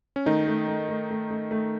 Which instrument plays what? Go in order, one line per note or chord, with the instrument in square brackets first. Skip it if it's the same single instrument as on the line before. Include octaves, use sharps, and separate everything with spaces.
[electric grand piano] C#4
[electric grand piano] D#3 D#4 [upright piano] A3
[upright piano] A3
A3
A3
A3
A3
A3